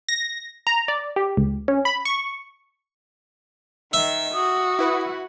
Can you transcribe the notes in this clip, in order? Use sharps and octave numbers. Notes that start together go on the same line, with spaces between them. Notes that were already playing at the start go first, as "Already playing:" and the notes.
A#6
A#5
D5
G4
C#2
C#4
B5
C#6
D#3 E5
F#4 D#6
E4 B4 F#5